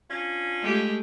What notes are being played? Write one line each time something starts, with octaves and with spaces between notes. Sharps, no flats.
C#4 D4 F4
G#3 A3 G4